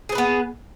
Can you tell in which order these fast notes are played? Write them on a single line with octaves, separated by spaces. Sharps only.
G#4 C5 B4 B3